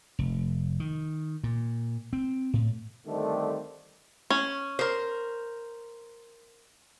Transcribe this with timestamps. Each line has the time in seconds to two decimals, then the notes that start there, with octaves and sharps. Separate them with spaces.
0.19 F1
0.80 D#3
1.44 A#2
2.13 C4
2.54 A2
3.07 D3 D#3 G3 A3 C4 D4
4.30 C#4
4.79 A#4 C5